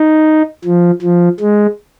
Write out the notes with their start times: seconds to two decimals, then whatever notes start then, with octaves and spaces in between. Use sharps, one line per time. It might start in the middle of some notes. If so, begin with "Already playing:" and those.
Already playing: D#4
0.64 F3
1.02 F3
1.40 G#3